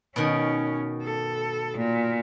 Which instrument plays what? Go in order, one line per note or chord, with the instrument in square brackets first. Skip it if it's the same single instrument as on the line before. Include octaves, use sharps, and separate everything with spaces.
[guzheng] B2 D#3 [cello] C#4
[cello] A4
A#2